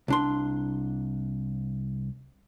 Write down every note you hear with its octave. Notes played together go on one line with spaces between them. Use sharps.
C2 D4 C6